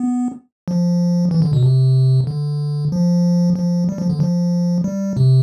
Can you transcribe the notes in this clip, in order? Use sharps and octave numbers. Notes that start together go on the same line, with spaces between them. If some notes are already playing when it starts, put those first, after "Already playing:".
Already playing: B3
F3
E3
D3
B2
C3
D3
F3
F3
G3
F3
D3
F3
G3
C3